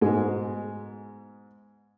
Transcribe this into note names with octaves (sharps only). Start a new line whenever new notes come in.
G#2 B2 G#3